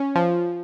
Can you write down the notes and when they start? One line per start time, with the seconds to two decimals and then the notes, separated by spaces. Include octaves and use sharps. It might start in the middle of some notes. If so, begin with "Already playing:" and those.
Already playing: C#4
0.15 F3